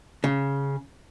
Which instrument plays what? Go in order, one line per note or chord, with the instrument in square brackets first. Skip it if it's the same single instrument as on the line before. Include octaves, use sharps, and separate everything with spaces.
[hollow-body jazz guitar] C#3